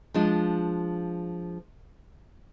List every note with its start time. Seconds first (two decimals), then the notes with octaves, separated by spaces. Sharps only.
0.14 F3 G#3 D4 F4